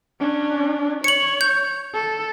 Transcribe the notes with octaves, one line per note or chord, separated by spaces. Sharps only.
C#4 D4
C#5 C#7 F#7
G6
A4